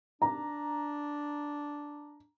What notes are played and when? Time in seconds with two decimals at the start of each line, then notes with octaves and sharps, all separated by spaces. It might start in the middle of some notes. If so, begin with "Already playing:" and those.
0.22 D4 A#5